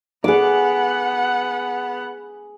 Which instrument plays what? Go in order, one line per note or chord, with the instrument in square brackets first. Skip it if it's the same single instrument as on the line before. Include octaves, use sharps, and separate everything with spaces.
[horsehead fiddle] B3 F#5 [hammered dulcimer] G#4 D6